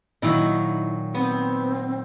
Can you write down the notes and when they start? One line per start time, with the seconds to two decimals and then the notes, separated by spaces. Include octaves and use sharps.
0.22 A#2 D#3 F#3 E4 D#5
1.14 B3 C4